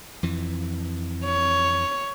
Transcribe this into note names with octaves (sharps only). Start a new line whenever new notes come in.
F2 E3
C#5